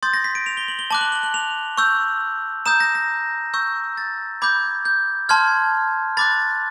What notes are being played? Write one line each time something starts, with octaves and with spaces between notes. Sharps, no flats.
C6 D#6 G6 A6
A#6
B6
D7
F7
G7
F#7
G7
A5 D6 F#6 F#7
F#7
F#7
F#7
F7
C#6 E6 G6
A#5 D#6 G6 E7
A#6
A#6
C#6 E6 G6
A6
B5 D6 G6 G#6
G6
A5 C6 F6 G#6
B5 D6 F#6 A6